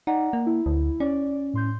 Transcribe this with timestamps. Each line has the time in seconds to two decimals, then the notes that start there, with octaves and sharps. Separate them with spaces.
0.07 D#4 D5 F#5 A#5
0.33 A#3
0.46 E4
0.66 D2
1.00 C#4 D5
1.53 A2 C6 G6